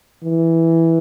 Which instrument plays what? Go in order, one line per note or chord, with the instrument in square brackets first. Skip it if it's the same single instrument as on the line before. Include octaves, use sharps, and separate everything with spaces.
[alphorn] E3